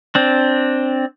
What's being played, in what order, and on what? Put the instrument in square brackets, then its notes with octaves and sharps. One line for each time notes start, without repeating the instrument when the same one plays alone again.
[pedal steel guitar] C4 D4